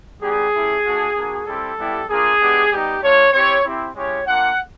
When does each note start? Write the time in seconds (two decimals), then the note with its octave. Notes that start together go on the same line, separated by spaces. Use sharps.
0.22 G3 B3 D#4 G4 G#4
0.54 A3 C#4 E4 G4
0.85 A3 D4 F#4
1.16 A#3 D4 F#4
1.46 G3 C4 E4 G4 A4
1.78 G3 B3 E4 G4
2.10 A#3 D4 F4 G#4
2.41 G#3 B3 D4 G4
2.71 G3 B3 D#4 G4
3.02 A3 D4 F4 C#5
3.33 C4 E4 G4 C#5
3.65 C4 E4 G4
3.96 G#3 C#4 E4 G4 C#5
4.27 A#3 D4 F4 F#5